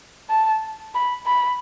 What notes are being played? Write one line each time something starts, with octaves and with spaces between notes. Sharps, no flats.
A5
B5
B5